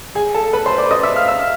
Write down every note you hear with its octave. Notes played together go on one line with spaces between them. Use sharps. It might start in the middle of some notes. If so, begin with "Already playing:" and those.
G#4 G#5
A4 A5
B4 B5
C5 C6
D5 D6
D#5 D#6
E5 E6
F5 F6
E5 E6